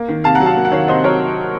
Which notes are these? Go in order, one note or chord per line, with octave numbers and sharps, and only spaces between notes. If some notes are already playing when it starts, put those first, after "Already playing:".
Already playing: A#3
D#3
C3 F5 A5
F#5 A#5
F#3
F5 A5
A#3
F#5
D#3 C#5 F5
C3 C5 D#5
F#3 A#4 C#5